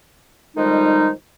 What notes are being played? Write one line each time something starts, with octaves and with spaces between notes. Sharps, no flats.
F2 D#3 F3 G3 G#3 D#4